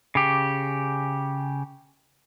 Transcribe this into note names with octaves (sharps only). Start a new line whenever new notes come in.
C#3 G4